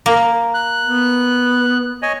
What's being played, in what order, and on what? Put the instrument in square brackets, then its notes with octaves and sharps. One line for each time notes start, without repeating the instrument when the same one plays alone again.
[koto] A#3
[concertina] F#6
[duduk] B3
[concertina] C#5 D#5 G#5